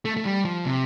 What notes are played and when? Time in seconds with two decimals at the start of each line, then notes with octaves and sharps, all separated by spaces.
0.05 A3
0.17 A3
0.25 G3
0.45 F3
0.65 C3